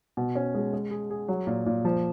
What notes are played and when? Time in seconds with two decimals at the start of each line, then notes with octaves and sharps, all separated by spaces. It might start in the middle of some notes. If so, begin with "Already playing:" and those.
0.17 B2
0.35 C#4
0.54 G#3
0.73 G#3
0.91 G#4
1.10 G#4
1.28 F#3
1.47 A#2
1.66 A#2
1.85 F3